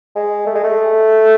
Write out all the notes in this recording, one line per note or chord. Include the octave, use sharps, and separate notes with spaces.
G#3
A3
G#3
A3